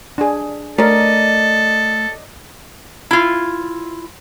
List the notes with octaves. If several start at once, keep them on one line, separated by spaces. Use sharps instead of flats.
D4 G#4
A3 A4 A#4 D5 D#5
E4 F4